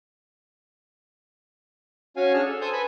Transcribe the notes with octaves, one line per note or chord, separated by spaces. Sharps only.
C#4 F#4 C#5 F5 G#5
D4 G#4 A5 F6
A4
A4 C5 G#5 A5 D#6 G6
B4 G#5 A5 B5